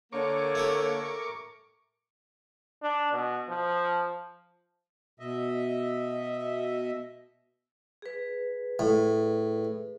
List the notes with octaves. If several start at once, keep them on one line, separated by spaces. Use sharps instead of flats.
D3 A#3 A#4 C#5 C#6 D6
A3 E4 G4
D4
B2
F3
B2 D#5 E5
G#4 B4
A2